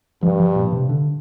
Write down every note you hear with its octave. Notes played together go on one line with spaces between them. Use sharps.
G2 F3
F3
A#2
C3
D3